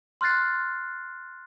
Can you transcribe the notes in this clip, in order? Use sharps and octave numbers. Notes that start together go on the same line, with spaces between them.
C6 F6 F#6 A6 C7